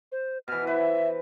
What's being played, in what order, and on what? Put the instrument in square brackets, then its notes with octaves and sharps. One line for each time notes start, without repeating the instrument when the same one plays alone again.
[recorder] C5
[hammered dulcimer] B2 E3 [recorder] F6
[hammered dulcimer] B4 C5 [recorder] E5